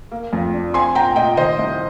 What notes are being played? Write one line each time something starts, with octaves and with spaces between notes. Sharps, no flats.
A#3
F2
D4
C4 G#5 C6
A#2 G5 A#5
A#2 D#5 G5
D#3 C5 D#5
C2